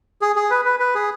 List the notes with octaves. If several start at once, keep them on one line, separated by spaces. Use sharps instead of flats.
G#4
G#4
B4
B4
B4
G#4